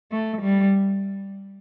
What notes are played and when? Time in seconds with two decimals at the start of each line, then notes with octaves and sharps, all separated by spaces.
0.12 A3
0.42 G3